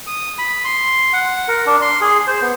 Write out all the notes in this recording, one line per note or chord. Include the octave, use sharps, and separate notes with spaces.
D#6
B5
C6
F#5
A#4
D4
C6
G#4
C5
B3